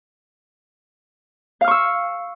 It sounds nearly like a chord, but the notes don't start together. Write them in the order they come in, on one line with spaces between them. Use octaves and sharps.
F5 F6 C#6 E6